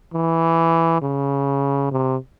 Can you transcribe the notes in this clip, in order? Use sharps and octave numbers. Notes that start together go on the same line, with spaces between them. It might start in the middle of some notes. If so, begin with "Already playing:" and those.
E3
C#3
C3